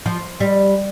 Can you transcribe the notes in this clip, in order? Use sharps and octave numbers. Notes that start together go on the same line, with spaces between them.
F3
G3